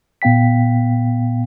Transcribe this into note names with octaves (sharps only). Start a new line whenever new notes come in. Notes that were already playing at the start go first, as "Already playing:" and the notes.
A#2 B3 F5 G5 B6